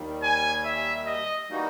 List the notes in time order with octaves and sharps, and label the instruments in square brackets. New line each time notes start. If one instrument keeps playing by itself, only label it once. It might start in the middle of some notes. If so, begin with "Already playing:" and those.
Already playing: [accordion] D#2 D#3 G3
[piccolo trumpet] G#5
E5
D#5
[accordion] E3 G3 A#3 D#4 F#4